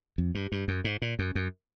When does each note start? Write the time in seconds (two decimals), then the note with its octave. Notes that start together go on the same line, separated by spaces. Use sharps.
0.18 F2
0.35 G2
0.52 G2
0.68 F#2
0.84 G#2
1.02 A#2
1.19 F#2
1.35 F#2